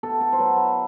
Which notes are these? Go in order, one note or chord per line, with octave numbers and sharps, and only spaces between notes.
B2 A4
A4
C5
F#3 B4
E5